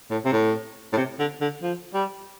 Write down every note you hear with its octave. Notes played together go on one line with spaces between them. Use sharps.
A2
C3
A2
A2
C3
D3
D3
F3
G3